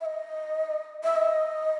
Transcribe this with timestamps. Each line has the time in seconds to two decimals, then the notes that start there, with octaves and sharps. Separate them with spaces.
0.01 E5
0.06 D#5
1.04 E5
1.16 D#5